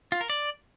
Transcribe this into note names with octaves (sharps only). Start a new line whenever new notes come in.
F4
A#4
D5